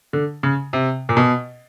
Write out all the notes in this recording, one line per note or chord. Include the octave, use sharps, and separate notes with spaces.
D3
C#3
C3
A#2
B2